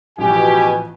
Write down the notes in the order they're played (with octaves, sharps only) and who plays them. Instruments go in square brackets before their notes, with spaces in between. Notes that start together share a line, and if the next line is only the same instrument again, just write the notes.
[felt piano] A1 F3 [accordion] B2 [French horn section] G4 [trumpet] G#5